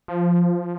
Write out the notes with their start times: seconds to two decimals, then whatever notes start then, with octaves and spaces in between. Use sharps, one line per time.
0.08 F3